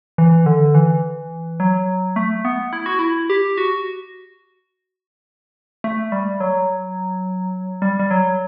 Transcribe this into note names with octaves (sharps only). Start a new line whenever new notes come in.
E3
D3
E3
F#3
A3
B3
E4
F#4
E4
G4
F#4
A3
G3
F#3
G3
G3
F#3